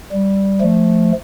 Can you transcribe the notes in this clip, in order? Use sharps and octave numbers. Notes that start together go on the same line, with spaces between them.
G3
F3 A3